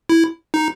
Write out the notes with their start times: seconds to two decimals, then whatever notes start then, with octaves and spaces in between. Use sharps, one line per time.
0.09 E4
0.54 D#4